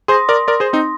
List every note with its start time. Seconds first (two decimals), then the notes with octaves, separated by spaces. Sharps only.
0.08 G#4 C5 C6 D#6 A#6
0.29 A#4 D5
0.48 A#4 D5
0.60 G#4 C5
0.73 C4 D#4